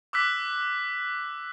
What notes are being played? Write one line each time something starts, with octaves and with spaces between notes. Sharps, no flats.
D6 E6 F#6 B6